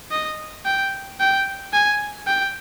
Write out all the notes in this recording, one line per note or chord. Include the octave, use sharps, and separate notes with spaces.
D#5
G5
G5
G#5
G5